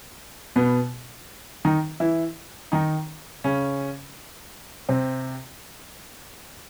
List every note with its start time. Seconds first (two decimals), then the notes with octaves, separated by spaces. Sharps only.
0.56 B2 B3
1.65 D#3 D#4
2.00 E3 E4
2.72 D#3 D#4
3.44 C#3 C#4
4.89 C3 C4